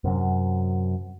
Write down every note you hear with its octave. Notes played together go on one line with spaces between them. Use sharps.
F#2 C3 F#3